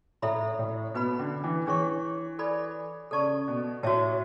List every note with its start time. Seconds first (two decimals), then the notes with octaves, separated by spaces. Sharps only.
0.22 A2 E4 A4 E5 B5
0.59 A2
0.94 B2 B4 F#5 B5
1.19 D3
1.44 E3
1.66 E3 D4 G#4 C#5 F#5 C#6
2.39 A4 D5 G#5 B5
3.11 C#3 A4 D5 A5 C#6
3.48 B2
3.83 A2 F#4 C#5 E5 A5